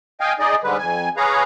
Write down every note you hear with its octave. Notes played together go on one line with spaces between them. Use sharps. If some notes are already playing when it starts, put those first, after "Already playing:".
D#5 F5 G5 G#5
D#4 G#4 D5 D#5
G#2 D3 G3 G#3 B4
F2 G#5
G#4 B4 C#5 F5 A#5